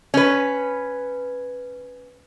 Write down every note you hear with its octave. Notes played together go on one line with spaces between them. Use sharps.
C#4 B4